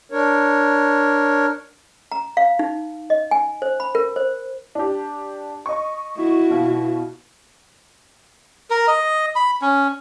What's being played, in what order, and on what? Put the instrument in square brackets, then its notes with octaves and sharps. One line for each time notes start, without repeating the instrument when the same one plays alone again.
[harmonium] D4 A#4 C#5
[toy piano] A#5
F5
D#4
D#5
G#5
C5
B5
A#4
C5
[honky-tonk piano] D4 G4
D#5 C#6
[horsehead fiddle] E4 F#4
[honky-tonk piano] B2 F4
[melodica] A#4
D#5
B5
C#4